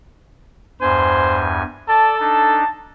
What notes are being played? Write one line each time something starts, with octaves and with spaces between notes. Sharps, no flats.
E2 G2 C5 G#5
A4 D5 A5
D4 D#4 A5